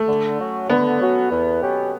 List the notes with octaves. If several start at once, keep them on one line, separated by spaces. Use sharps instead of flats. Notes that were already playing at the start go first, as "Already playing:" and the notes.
Already playing: A3
D3
F#3 C#4 F#4
D3 B3
F#3 C#4 F#4
E2
B2 F#3 C#4 G4